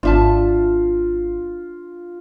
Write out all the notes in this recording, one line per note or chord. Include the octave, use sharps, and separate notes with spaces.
G#1 D4 F4 D5 E5 A5